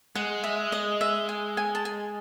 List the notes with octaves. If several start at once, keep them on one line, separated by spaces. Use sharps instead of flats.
G#3 F#5
E5
D#5
E5
G#5
G#5
A5
G#5